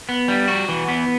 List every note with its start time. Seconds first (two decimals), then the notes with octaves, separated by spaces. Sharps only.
0.09 B3
0.28 G3
0.48 F#4
0.69 E3
0.89 B3